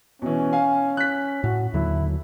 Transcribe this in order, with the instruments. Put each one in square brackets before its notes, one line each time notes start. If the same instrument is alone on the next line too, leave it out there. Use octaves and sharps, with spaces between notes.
[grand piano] B2 E3 [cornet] C#4
[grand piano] F5 G#5
F#6 B6
[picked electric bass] A2 [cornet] F#4
[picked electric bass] D#2 D3 F#3 [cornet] E4